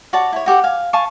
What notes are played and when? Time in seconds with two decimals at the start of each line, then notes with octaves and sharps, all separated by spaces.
0.13 F#4 C#5 D5 A5
0.32 E4 C#5
0.46 F#4 G4 A4 F#5
0.64 F5 G#5
0.93 F5 G#5 A5 C#6